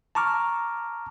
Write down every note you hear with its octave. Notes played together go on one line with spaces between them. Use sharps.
A5 A#5 C#6 D6 F6